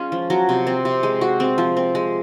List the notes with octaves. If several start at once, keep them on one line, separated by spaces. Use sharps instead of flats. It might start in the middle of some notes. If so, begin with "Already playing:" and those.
Already playing: G#3 C#4 F4
F3
F#3
C3
C4
C3
G#3
F#4
C4
F3
C4
G#3